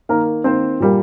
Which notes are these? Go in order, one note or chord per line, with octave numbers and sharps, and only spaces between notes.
D#3 A#3 A#4
D#3 A#3 C4 C5
A#2 G3 A#3